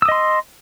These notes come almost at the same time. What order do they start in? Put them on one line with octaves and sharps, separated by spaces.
E6 D#6 D#5 C6